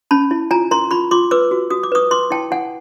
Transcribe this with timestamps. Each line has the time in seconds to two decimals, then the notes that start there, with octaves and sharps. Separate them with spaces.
0.11 C#4 A5 B5
0.31 E4
0.51 F4 G#5 A#5
0.71 A#4 A#5 C6
0.91 F4 B5 C#6
1.11 F4 C6 D6
1.31 B4 D6 E6
1.51 F#4
1.70 F#4 D#6
1.83 D6
1.92 B4 C#6 D#6
2.11 B4 C6 D6
2.31 E4 G5 A5
2.51 E4 F#5 G#5